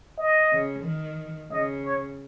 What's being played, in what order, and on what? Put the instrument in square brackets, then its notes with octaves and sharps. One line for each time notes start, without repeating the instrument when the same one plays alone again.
[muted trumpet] D#5
[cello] C#3
D#3
[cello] C#3 [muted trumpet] D#5
[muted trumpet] C#5